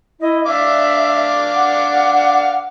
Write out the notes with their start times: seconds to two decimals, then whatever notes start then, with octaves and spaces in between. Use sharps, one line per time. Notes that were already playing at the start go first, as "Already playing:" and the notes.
0.19 E4 D#5
0.46 D4 E5 F5 D6
1.54 F#5